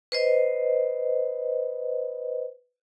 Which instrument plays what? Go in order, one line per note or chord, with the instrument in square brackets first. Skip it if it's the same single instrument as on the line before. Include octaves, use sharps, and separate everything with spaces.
[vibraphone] B4 C5 D#5